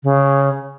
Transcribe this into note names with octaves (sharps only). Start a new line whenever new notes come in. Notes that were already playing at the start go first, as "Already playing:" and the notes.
C#3